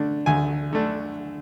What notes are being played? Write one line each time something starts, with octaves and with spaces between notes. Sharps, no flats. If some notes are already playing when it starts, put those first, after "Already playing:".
Already playing: D3 A3 D4
D2 G#5
D3 A3 D4